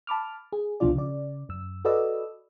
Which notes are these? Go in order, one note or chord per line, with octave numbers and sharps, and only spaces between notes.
A5 B5 D6 F6
G#4
C2 B2 F3 D4 F4 D5
C#3 D5
F#2 E6
F#4 A4 B4 D5 D#5 E6